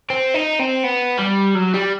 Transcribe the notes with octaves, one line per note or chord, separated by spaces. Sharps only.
C4
D#4
C4
B3
G3
F#3
G3